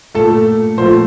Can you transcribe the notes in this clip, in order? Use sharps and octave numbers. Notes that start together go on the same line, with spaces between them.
A#2 A3 A4
A#2 F3 A3 C5